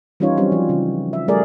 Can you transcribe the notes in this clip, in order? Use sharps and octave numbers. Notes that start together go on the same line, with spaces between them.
E3 G3 C#4 D#4 F4 C#5
F#3 G3 C4 C#4
F3
C#3 E3
E5
G3 A3 G#4 A#4 D5